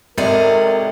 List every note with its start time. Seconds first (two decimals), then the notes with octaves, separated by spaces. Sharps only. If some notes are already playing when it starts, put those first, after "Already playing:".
0.18 G#1 C3 A4 A#4 D5 D#5